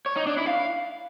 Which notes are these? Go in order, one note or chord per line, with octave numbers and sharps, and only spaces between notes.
C#5
D#4
D4
E4
F5